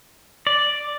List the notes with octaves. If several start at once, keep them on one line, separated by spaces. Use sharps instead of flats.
D5